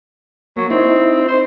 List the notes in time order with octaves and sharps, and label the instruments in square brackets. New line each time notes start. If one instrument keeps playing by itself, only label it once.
[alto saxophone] F#3 [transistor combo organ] A#3
[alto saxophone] C4 [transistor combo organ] D#4 E4
[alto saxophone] C5